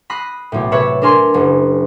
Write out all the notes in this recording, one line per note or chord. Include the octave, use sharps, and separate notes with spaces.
B5 D#6 F#6 A#6 C7
B1 A2
C3 B4 C#5 E5 A5
D4 A4 A#4 G#5 C6
F#1